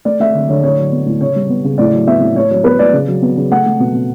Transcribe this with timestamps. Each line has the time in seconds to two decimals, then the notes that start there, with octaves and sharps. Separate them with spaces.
0.05 A3 D5
0.20 A3 E5
0.35 D3
0.48 D3 C#5
0.63 A2 C#5
0.78 F#3
0.92 B3
1.06 A2
1.20 C#3 C#5
1.36 G3
1.49 B3
1.64 C#3
1.78 A2 D5
1.93 F#3
2.07 B3 E5
2.21 A2
2.35 A2 C#5
2.51 F#3 C#5
2.64 B3 B4
2.79 A2 D5
2.93 C#3
3.08 F#3
3.22 B3
3.37 C#3
3.51 A3 F#5
3.66 A3
3.80 B2
3.94 B2